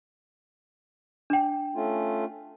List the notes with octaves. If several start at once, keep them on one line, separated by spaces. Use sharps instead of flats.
D4 G5
A3 C#4 F4